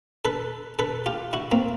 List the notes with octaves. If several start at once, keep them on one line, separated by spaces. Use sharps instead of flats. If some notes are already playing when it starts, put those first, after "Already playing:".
A4 B4
A4 B4
F4 G4
E4 F#4
A#3 C4